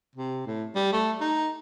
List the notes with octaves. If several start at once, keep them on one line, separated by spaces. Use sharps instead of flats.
C3
A2
G3
A3
D#4